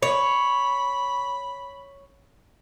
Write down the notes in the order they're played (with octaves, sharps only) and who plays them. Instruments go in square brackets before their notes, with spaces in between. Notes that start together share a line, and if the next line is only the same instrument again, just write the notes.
[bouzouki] C#5 [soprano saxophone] B5